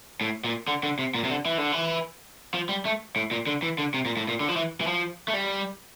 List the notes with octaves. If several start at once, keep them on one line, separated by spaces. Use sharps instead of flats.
A2
A#2
D3
D3
C3
A#2
C3
D3
E3
D3
E3
F3
G3
A3
A2
A#2
D3
E3
D3
C3
A#2
A2
A#2
D3
F3
E3
E3
F3
A3
G3